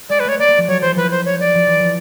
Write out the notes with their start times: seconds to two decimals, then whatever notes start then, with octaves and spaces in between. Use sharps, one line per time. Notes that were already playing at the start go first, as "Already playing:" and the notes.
0.09 G#3 D5
0.20 B4
0.24 A3 C#5
0.39 A#3 D5
0.48 A3
0.58 F3
0.68 F#3 C#5
0.81 E3 C5
0.96 F3 B4
1.11 C5
1.25 C#5
1.40 D5
1.55 F3
1.67 E3
1.80 F3